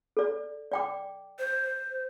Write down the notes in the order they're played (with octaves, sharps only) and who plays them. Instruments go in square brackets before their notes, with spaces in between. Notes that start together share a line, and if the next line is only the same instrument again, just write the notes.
[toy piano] A4 D5
D5 G5 D6
[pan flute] C5